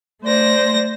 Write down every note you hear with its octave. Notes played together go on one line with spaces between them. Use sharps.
A3 C5 D5 A#6